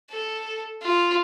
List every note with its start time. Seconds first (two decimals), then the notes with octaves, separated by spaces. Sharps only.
0.11 A4
0.83 F4